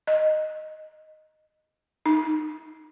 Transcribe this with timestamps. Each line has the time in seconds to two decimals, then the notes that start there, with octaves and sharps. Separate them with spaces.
0.07 D#5
2.06 D#4